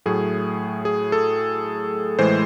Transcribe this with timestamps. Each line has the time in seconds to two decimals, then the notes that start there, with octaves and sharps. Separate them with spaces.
0.06 A2 F#3 A3 G#4
0.85 G#4
1.12 A4
2.19 A2 E3 G#3 C5